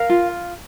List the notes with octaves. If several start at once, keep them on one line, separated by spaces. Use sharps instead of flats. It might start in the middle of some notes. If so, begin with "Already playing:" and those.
Already playing: A#4 F5
F4